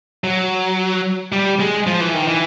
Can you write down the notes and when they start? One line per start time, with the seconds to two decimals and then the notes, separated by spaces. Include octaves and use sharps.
0.24 F#3
1.32 G3
1.60 G#3
1.87 F3
2.00 E3
2.14 D#3
2.28 E3